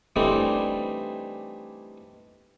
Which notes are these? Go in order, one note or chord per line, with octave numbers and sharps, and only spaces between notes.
E3 G3 A3 C4 D4 D#4